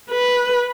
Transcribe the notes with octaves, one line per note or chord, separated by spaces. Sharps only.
B4